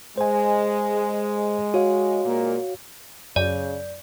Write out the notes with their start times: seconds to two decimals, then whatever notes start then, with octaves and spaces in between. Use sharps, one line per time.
0.18 G#3 C5 G#5
1.74 F#4 C#5 F5
2.25 A#2 G#3 A#3
3.36 F#2 C#3 D5